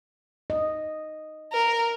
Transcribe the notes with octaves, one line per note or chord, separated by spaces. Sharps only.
D#5
A#4